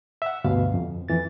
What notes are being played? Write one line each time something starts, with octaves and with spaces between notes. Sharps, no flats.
E5 F#5
D2 G2 B2 F5
F2
F2 E3 A6